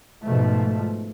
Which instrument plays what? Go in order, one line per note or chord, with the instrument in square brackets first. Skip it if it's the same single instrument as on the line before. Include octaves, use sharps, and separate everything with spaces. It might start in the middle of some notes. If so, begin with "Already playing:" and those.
[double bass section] G#2 B2 F3 A3